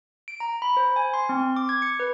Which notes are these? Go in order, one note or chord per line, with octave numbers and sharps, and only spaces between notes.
D7
A#5
B5
C5
G#5
C6
C4
D6
G#6
C#7
B4